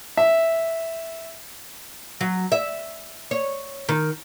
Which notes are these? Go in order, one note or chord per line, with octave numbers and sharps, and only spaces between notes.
E5
F#3
E5
C#5
D#3